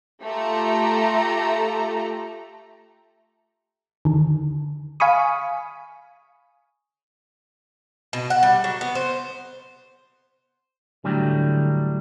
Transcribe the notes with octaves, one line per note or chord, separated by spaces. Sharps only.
A3 F4 G4 A4 A#5
D3 D#3
F5 G#5 B5 C#6 D#6
B2
F#5
G3
F#3
B3
C5
A2 D3 F#3 G3